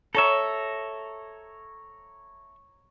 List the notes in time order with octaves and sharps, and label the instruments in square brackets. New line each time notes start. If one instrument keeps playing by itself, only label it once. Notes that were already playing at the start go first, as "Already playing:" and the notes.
[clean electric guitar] A4 E5 [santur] C#5 A#5